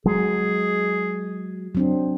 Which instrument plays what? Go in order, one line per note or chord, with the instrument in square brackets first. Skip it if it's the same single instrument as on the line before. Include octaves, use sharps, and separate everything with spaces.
[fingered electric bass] F#3 G#3 [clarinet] G#4
[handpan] F#3 C4 D4